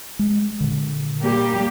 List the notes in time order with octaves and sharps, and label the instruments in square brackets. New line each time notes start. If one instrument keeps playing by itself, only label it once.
[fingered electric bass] G#3
A#2 D3
[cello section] G3 A#3 G4